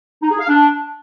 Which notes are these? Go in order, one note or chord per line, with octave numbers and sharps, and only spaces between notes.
D#4
G#4
F5
D4